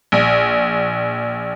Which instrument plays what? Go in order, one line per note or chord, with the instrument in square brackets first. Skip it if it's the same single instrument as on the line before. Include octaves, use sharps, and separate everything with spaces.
[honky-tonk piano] A#1